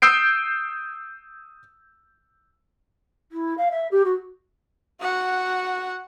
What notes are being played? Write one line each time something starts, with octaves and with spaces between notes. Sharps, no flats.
D#6 E6 G6 C7 D7
E4
F5
E5
G4
F#4
F#4 F#5